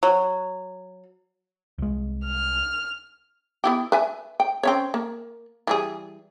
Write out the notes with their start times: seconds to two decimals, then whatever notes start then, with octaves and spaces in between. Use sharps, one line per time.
0.03 F#3
1.78 C2 G#3
2.26 F6
3.64 B3 E4 G4
3.92 B4 E5 G#5
4.40 G5
4.63 C4 C#4 C#5
4.94 A#3
5.67 E3 G3 G#4